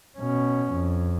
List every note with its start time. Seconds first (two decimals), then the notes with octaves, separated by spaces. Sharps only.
0.18 B2 C#4
0.72 F2